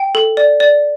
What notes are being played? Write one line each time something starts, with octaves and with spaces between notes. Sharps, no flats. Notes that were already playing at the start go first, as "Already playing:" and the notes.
Already playing: G5
A4
D5
D5